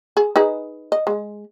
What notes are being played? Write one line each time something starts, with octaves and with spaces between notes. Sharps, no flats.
G#4
D#4 G#4 B4
D#5
G#3